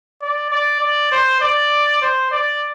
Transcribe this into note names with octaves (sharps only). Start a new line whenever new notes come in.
D5
D5
D5
C5
D5
C5
D5